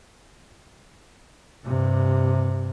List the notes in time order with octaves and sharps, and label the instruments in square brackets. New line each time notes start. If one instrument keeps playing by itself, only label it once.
[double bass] G2 C3